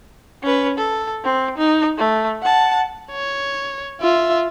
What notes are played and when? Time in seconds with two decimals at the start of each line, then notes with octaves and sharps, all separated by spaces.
0.43 C#4 B4
0.78 A4
1.25 C4
1.58 D#4
1.98 A3
2.42 F#5 A5
3.12 C#5
4.01 F4 E5